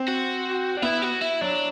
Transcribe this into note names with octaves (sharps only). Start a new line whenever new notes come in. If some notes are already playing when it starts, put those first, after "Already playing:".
Already playing: C4
F#4
D4
B3 E4
F#4
E4
F#3 D4